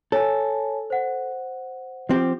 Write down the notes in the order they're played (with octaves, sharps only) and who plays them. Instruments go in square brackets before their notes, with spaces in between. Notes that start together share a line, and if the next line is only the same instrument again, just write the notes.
[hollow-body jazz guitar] A4 [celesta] C#5 G#5 A5
[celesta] C5 F#5
[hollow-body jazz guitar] F3 C4 G4